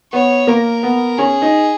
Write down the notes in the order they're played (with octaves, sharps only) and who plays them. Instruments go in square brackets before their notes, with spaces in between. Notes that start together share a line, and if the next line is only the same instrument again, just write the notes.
[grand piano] B3 [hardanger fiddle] C#5
[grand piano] A#3 [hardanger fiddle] A#4
[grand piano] B3
[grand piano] C#4 [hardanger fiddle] G#4
[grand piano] D#4